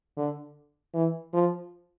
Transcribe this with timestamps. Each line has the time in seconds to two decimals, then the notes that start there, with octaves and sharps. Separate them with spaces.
0.17 D3
0.94 E3
1.33 F3